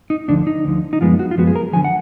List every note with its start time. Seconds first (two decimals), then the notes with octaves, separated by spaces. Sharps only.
0.10 D#4
0.28 D2 D3 F3 D4
0.47 D#4
0.65 D2 D3 F3
0.93 D#4
1.01 F#2 F3 G#3 B3 F4
1.19 F#4
1.31 F4
1.37 F#2 F3 G#3 B3 F#4
1.47 G#4
1.55 A#4
1.73 D3 F3 G#5
1.84 F#5